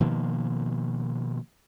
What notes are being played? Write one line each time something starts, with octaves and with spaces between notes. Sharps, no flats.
B2 D#3 F3 A#3